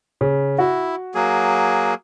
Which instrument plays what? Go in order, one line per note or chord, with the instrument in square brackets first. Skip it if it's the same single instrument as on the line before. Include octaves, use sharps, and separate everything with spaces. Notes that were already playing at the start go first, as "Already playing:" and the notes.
[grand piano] C#3
[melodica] E4 [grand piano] F#4
[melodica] F#3 A#3 G#4